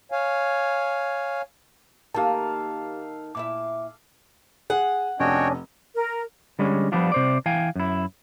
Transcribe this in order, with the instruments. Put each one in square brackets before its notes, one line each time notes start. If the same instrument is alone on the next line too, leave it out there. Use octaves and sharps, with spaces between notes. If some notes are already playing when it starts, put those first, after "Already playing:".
[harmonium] C#5 F5 G#5
[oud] D#3 A#3 [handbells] G4 A5 [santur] A4 F5
[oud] A#2 E4 E5 [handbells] D6
[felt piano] G#4 [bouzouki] F#5
[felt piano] F1 [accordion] C#4 D4 D#5 [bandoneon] F#4 C#5 G5
[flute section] A#4
[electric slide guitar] D3 G3 G#3 C#4
F3 G3 B3 D4 F4
C3 C5 D5
E3 F5 G5 G#5
F#2 E4